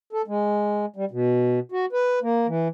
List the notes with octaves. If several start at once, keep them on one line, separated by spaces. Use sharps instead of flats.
A4
G#3
G3
B2
F#4
B4
A#3
E3